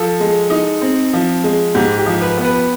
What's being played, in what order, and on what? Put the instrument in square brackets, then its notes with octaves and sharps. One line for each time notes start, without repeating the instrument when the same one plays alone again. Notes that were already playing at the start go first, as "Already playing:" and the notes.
Already playing: [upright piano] F3 [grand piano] A4
[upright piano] G#3
D#4
C4
F3
G#3
[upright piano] G#2 [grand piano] G4
[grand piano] G4
[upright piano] F3
[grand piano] B4
[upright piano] B3
[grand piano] B4